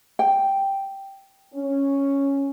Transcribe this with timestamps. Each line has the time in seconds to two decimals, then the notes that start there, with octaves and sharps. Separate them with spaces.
0.19 G5
1.54 C#4